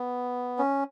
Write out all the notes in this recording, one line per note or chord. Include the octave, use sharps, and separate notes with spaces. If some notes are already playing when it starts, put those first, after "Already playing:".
Already playing: B3
C#4